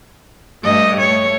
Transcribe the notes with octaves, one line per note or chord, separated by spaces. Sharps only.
G2 A3 D#5
A3 C#5